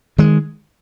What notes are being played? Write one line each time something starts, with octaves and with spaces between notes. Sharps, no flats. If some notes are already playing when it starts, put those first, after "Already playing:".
D#3 G#3